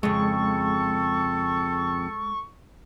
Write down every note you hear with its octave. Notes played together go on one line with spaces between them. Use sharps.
F2 C#3 G#3 A4 C#6